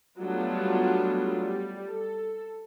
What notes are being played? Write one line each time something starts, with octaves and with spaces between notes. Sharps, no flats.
F#3 G3 A3 B3 D4 F4
G3
A4